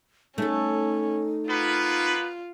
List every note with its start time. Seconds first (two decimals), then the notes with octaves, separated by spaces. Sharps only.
0.38 A3 C#4 D#4 A4
1.50 A#3 B3 F4 B4